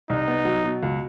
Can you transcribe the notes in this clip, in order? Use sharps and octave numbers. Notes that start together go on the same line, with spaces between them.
C2 D#4
B3
F#3
B2
C#2